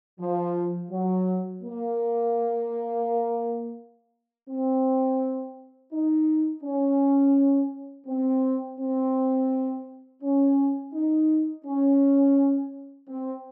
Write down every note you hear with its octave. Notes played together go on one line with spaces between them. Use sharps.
F3
F#3
A#3
C4
D#4
C#4
C4
C4
C#4
D#4
C#4
C4